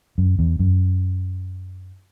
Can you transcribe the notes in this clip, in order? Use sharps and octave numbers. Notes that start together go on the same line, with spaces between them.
F#2
E2
F#2